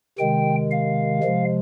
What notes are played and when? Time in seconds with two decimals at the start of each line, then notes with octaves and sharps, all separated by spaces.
0.19 C3 D#3 G#3 G5
0.72 F5
1.23 C3 F3 G#3